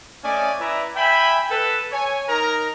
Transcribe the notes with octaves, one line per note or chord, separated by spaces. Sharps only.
A3 C#4 D5 D#5 G#5
E4 B4 D5 E5 A#5
E5 G5 G#5 B5
A4 B4
C#5 G#5
D#4 A#4 A#5